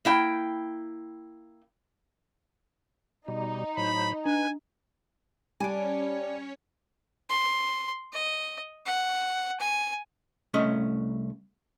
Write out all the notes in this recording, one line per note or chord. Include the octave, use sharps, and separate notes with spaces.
A#3 E4 G5
B2 G3 D#4
A2 F#3 C5 B5
D4 B4 G#5
G3 C#4 D4 C#5 G#5 D7
C6
D#5
F#5
G#5
C2 A3 C#4 C#5 D#5